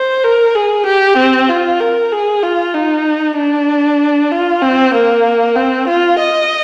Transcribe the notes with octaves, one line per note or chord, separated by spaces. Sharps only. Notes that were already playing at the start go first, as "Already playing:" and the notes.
Already playing: C5
A#4
G#4
G4
C4
F4
A#4
G#4
F4
D#4
D4
F4
C4
A#3
C4
F4
D#5